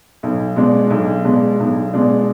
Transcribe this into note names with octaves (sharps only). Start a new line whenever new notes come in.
B1
B2 G#3 D4
B1
B2 G#3 D4
B1
B2 G#3 D4